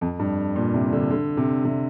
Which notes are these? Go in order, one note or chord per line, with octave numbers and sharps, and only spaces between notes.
F2
G2
A#2
C3
D3
D3
C3
C3